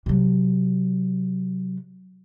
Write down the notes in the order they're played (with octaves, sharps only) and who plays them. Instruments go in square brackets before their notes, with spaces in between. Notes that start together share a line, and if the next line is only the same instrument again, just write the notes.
[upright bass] C3 F#3